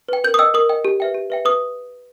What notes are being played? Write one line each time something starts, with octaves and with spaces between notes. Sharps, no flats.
B4 G5
A#4 G6
D#6
D#5 G5 E6
A#4 D#6
D#5 G5
G4
B4 E5 G5
G4
B4 E5 G5
B4 D#6